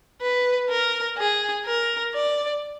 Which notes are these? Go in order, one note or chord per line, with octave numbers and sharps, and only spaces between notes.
B4
A#4
G#4
A#4
D5